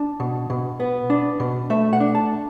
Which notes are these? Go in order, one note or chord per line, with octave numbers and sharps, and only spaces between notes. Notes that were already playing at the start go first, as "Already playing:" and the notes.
Already playing: D4 A5
B2
B2
B3
D4
B2
A3 E5
F#5
D4
A5